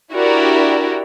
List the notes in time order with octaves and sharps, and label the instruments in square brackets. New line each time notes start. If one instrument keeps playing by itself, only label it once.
[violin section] D4 E4 F#4 G4 A#4 D5